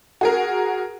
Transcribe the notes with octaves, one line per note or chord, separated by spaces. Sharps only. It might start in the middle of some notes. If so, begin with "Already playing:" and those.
F#4 G#4 A#4